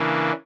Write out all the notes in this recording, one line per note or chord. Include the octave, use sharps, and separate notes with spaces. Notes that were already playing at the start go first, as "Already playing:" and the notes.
Already playing: C#3 E3 A#3 D4